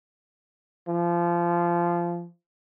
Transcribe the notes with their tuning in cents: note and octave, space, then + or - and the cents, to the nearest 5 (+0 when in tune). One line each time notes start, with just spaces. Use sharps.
F3 -20